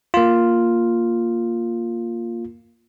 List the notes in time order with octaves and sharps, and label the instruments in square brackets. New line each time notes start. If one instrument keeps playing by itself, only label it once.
[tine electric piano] A#3 F4